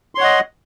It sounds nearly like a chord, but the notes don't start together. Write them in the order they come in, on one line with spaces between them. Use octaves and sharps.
C6 C#5 F#5 D#5